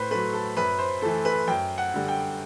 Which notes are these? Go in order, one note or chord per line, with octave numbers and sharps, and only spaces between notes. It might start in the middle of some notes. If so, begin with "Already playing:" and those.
Already playing: A2 B4 C5
F#3 A3 B4
A4
F#2 B4
C5
E3 A3 A4
B4
F#2 G5
F#5
D3 G3
G5